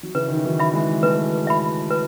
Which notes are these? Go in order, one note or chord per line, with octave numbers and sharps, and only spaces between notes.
F#3
C#3 E3 B4
D#3
E3
D#3 F#3
E5 B5
E3 G#3
F#3 A3 B4
E5 B5
B4